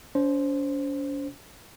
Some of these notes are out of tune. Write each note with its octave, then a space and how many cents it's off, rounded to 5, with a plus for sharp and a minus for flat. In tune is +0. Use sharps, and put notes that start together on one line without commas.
C#4 +45 C5 +0